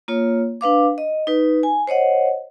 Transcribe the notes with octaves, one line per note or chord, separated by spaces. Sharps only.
A#3 F4 C#5
D4 B4 F5 D6
D#5
D#4 B4
G#5
C5 C#5 D#5 F#5